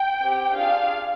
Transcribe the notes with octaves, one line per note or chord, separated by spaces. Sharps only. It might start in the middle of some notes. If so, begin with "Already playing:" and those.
Already playing: G5
C4 G4
D4 F4 G#4 F5